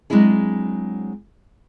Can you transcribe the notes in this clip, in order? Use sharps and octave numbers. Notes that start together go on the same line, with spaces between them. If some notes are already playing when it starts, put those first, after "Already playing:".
F#3 G#3 C4 D4 E4 G#4